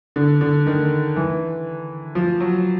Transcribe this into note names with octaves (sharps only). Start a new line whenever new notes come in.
D3
D3
D#3
E3
F3
F#3